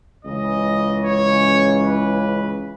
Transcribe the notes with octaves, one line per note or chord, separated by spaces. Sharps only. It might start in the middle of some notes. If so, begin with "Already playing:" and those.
C#2 C#3 E3 D#5
C#5
B4